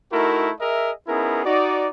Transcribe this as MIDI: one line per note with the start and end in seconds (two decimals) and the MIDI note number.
0.12 0.50 57
0.12 0.50 63
0.12 0.50 64
0.12 0.50 66
0.12 0.50 70
0.60 0.91 68
0.60 0.91 70
0.60 0.91 75
0.60 0.91 76
1.07 1.43 59
1.07 1.43 61
1.07 1.43 63
1.07 1.43 64
1.07 1.43 68
1.07 1.43 70
1.45 1.88 63
1.45 1.88 66
1.45 1.88 74